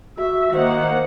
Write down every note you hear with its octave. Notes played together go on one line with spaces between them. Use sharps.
F#4 E5
D#3 A#3 C5 F#5